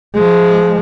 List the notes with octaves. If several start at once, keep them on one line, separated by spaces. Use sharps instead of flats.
F3 G#3